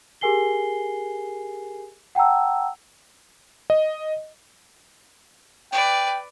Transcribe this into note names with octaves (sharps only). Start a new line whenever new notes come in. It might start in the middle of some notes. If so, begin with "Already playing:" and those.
G4 G#4 A#4 G#5 C7 G7
F#5 G5 A5 A#5 E6
D#5
B4 D5 G5